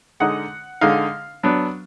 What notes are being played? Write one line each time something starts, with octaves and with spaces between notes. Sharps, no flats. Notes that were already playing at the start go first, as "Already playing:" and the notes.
D3 G#3 D#4 F#5
D3 G#3 D#4 F5
F#3 B3 D4